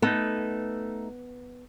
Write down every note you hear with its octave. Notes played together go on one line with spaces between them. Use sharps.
A3 B3 D#4 A4